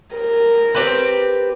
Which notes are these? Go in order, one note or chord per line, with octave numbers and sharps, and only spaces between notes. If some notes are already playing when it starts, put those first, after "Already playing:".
A#4
C4 G4 B4